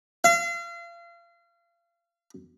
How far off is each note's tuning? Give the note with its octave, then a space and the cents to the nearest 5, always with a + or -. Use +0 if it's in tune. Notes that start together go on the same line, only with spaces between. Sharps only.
F5 -35